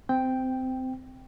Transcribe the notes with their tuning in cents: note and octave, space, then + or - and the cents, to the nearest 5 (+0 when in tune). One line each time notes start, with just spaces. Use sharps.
C4 -20 G5 +0